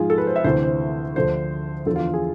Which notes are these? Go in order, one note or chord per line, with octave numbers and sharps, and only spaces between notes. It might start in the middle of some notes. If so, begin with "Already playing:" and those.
Already playing: G#2 F3 F4 G#4
A4
B4
C5
E5
D2 C3 E3 C5
C5
D2 D3 F3 C5
E2 D3 F3 A4
F4
G#4